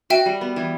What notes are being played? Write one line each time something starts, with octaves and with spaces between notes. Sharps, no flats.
F#4 E5 G5
G3
B3
E3